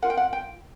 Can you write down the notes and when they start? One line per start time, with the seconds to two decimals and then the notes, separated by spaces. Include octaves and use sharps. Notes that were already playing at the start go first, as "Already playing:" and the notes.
0.02 F4 A#4 F#5
0.10 G5
0.17 F#5
0.33 G5